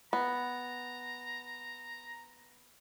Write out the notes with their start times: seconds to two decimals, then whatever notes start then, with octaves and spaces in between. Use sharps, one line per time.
0.13 B3 A#5